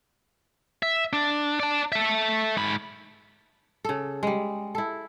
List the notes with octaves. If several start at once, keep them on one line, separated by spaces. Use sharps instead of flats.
E5
D4
D5 A5
A4 E5
G#2 B5
C#3 A4
G3 G#3
E4 A4